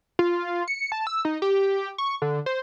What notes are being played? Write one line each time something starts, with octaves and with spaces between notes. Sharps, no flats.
F4
C#7
A5
E6
D#4
G4
C#6
D3
C5